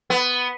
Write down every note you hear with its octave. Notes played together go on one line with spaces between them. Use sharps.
B3